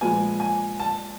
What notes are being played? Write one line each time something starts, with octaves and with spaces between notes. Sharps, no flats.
A#2 F3 G#3 B3 G#5
G#5
A5